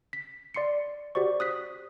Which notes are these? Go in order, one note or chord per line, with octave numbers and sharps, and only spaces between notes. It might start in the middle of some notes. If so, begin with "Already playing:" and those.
B6
D5 C6 C7 C#7
F#4 G4 C5 D5 C#6
D#6 F#6 B6